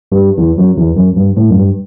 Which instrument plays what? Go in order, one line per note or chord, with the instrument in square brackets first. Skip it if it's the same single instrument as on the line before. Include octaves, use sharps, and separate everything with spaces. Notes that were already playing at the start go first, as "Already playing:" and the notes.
[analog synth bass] G2
E2
F#2
E2
F#2
G2
A2
F#2
G2